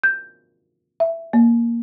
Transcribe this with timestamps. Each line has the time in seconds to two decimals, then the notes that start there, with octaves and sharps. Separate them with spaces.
0.04 G6
1.00 E5
1.33 A#3